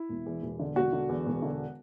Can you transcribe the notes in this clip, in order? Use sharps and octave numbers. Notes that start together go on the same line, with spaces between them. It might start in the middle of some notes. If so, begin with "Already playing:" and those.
Already playing: E4
E1
E2
E1
D3
E1 F#4
D3
E2
E1
D3